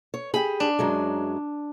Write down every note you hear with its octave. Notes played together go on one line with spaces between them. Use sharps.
C#5
G4 G#4 B5
D4
F#2 F#3 G#3